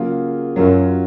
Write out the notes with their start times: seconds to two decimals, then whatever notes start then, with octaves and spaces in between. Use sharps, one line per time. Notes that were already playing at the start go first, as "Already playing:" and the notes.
Already playing: C#3 F#3 A#3 F4 G#4
0.56 F#2 F#3 C#4 F4